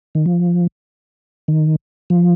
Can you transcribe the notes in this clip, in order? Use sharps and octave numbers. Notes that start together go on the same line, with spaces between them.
D#3
F3
D#3
F3